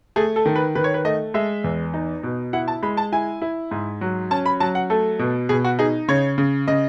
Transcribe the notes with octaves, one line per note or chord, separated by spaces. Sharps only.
A3 G#4
A4
D#3
B4
D#3 B4
C#5
B4
A3 D#5
G#3 E5
E2
D#4
B2
E4 F#5
A5
G#3 B5
A5
E4 G#5
E4
G#2
F#3
C#4 A5
B5
F#3 A5
F#5
A3 A4
B2
B2 G#4
F#4
D#4 G#4
C#3 C#5
C#3
C#3 D#5